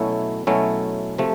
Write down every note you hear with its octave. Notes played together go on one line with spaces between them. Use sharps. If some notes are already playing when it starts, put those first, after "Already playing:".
Already playing: B2 F#3 A3 C#4 E4
B2 F#3 A3 C#4 E4
C3 F3 A3